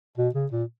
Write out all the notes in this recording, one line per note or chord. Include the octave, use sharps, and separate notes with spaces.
B2
C#3
A#2